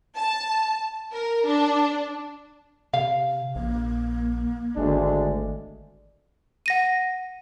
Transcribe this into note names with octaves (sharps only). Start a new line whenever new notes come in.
A5
A#4
D4
C3 F5
A#1 A#3
G#1 D2 G#3 D4
F#5 A#6 D#7